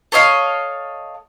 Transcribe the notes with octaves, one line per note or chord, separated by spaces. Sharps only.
A4 C#5 D#5 F5